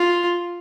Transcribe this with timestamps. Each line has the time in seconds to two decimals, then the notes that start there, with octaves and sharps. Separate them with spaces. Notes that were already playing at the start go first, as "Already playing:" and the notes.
Already playing: F4